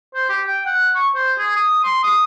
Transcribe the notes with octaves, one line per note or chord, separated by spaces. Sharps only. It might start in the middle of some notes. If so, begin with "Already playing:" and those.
C5
G4
G5
F#5
C#6
C5
G#4
D#6
C6
D#6